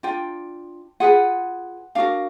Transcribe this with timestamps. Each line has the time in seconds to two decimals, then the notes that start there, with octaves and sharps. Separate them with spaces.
0.03 D4 F4 G5
1.00 F4 G#4 B4 F#5
1.95 D4 F#4 A#4 F5